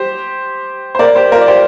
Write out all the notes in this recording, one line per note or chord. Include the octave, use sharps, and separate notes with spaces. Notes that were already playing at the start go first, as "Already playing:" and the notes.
Already playing: G4 C5
C5
A#4 D5
G4 C5
F4 A#4
D5
G4 C5